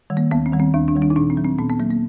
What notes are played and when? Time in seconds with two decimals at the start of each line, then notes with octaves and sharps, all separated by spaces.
0.10 D#3 G3
0.17 A#3
0.31 D#2 B3
0.46 C4
0.52 D#3 G3
0.60 C4
0.74 D#2 D4
0.88 D4
0.95 D#3 G3
1.02 D4
1.10 D#4
1.16 A#2 D4
1.30 C4
1.37 F#3
1.45 C4
1.59 A#2 B3
1.69 B3
1.80 F#3 A#3
1.90 A#3